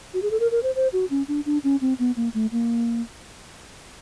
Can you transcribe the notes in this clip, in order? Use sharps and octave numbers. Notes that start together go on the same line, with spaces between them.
F#4
G#4
A4
A#4
A#4
C5
C5
F#4
C#4
D4
D4
C#4
C4
B3
A#3
A3
A#3